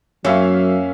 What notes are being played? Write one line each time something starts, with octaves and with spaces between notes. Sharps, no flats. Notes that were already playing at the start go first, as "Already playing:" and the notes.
F#2 F#3 A#3 C#4 E5 F5